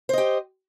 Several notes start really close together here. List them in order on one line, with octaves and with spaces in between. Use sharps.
C5 D#5 G4